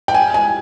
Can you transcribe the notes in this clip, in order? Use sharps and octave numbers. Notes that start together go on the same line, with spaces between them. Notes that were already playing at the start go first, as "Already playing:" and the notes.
G5
G#5
G#5